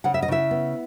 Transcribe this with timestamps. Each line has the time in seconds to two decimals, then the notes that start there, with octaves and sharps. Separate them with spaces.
0.04 C#3 F#5
0.14 E5
0.23 D#5
0.28 C#3 E4 E5
0.51 B3